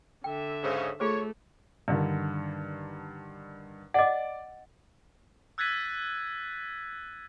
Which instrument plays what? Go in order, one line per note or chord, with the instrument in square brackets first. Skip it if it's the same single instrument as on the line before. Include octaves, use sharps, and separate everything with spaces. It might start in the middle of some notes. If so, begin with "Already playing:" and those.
[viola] D3 E5 [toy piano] G5
[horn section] G#2 C#3 C#4
[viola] A3 [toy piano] F4 G#4 C5 [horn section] C#5
[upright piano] G2 D3 D#3
[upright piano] D5 D6 [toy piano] D#5 F#5
[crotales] E6 F#6 G#6 A6 B6 D#7